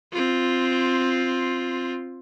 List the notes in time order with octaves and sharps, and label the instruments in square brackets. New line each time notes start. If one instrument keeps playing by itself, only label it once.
[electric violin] C4 F4